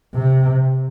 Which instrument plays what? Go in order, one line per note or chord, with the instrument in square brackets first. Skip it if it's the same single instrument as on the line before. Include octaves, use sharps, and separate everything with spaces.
[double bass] C3